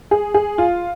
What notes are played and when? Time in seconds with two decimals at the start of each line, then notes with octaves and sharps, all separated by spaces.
0.11 G#4
0.34 G#4
0.58 F4